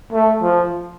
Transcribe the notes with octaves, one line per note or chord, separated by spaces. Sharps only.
A3
F3